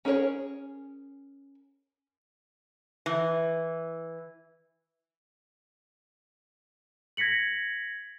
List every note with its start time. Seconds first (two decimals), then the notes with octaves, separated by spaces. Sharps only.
0.05 C#4 G#4 A#4 B4 C#5
3.06 E3
7.17 G#6 A#6 B6 C#7 F#7